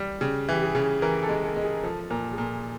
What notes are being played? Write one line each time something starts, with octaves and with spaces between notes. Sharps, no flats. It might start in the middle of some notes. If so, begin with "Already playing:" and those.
Already playing: G3
C#3 G4
E3 G4
G#4
C#3
E3 A#4
A4
G#3
A4
G#3
G#4
F3 A4
A#2 A#4
G#4
A#2 A4